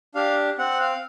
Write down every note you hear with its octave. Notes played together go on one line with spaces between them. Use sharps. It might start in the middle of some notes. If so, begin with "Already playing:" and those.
D4 G4 F5
C4 F#5
F5